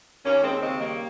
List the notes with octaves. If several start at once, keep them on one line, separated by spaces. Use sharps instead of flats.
D#2 A#3 C#4
D#2 G#3 C4
C#3 G#3 C4
D#3 G3 A#3